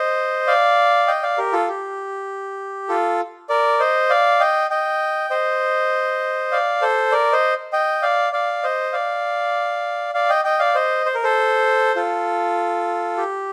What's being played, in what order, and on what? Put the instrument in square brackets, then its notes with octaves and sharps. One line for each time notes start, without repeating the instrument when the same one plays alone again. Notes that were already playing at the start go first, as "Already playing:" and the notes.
Already playing: [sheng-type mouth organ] C5 D#5
D5 F5
D#5 G5
D5 F5
G4 A#4
F4 A4
G4
F4 A4
A#4 D5
C5 D#5
D5 F5
D#5 G5
D#5 G5
C5 D#5
D5 F5
A4 C5
A#4 D5
C5 D#5
D#5 G5
D5 F5
D5 F5
C5 D#5
D5 F5
D5 F5
D#5 G5
D#5 G5
D5 F5
C5 D#5
C5
A#4
A4 C5
F4 A4
G4